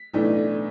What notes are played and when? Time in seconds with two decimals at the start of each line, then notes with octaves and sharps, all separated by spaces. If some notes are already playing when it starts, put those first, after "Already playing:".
Already playing: B6
0.13 B1 A2 E3 A3 D4